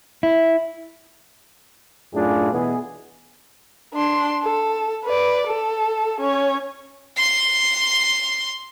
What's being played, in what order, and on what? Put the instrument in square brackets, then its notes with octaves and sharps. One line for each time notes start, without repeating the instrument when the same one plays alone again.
[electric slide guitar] E4
[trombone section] F#2 A2 D4 E4 F4 G#4
B2 E3 B3 G#4
[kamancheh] D4 C6
A4
B4 D5
A4
C#4 C#5
[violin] C6 C7